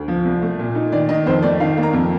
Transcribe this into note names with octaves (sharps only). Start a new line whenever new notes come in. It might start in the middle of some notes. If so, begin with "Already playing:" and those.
Already playing: D2
F3
C2
A3
A#2
D#4
D#3 D5
D#3 D#5
F2 C5
A3 D5
D#3 F5
A#3
A#5
F2